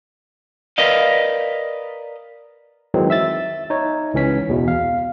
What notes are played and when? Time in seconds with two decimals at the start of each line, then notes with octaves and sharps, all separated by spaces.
0.78 A#4 B4 D5 D#5 F5
2.94 D#3 E3 F#3 G#3 C4
3.10 E5 E6 A6
3.70 D#4 C#5
4.14 C#2 E3 C#4 B6
4.49 E2 B2
4.68 F5